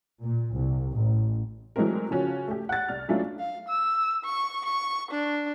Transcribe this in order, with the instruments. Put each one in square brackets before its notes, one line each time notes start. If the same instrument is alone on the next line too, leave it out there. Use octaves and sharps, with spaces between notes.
[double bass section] A#2
C2
A1
[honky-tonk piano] E3 F#3 G#3 A3 C4 A#4
C#3 F3 C#4 F#4
A3 G4
F#5 A6
C2 F6
F#3 A3 C#4 D4 E4 F4
[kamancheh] F5
E6
C#6
C#6
D4